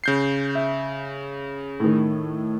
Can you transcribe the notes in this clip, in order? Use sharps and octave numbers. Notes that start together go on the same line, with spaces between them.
C#3 G6 C7
E5
A2 D#3